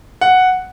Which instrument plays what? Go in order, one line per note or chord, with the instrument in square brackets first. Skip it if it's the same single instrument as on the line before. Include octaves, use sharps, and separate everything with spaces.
[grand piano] F#5